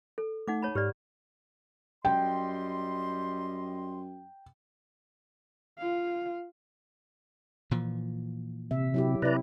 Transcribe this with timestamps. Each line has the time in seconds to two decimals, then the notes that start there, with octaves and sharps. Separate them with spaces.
0.18 A4
0.48 A3 D#4 F#5 D6
0.62 C#5 A5 B5
0.75 G#2 G4 D5 F6
2.05 F#2 G3 D#5 G5 C6
5.78 F4 F5
7.71 A#2 E3 F3
8.71 C3 E5
8.94 F#3 E4 G4
9.22 C3 E4 B4 D5 A#5